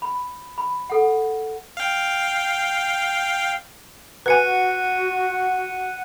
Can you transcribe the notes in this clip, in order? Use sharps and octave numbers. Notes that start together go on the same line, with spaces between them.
B5
B5
A4 F#5
F5 G5
F#4 B4 F#5 G#5 F#6 C#7 D#7